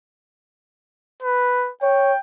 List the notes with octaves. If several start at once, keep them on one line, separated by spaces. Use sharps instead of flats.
B4
C#5 G5